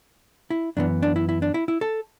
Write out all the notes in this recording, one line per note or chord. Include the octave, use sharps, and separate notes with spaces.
E4
F#2 E3 B3 D4
D4
E4
E4
D4
E4
E4
A4